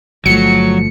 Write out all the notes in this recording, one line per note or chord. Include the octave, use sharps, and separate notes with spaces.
G1 F3 F#3 A3 C#7